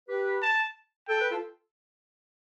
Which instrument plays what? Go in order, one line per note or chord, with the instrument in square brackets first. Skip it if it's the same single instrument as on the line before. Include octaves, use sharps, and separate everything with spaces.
[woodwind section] G4 B4
[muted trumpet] A5
[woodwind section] A4 [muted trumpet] G5
[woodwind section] B4
F4 A4